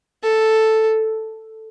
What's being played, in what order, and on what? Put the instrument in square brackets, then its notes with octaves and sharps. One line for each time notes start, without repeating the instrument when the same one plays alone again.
[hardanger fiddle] A4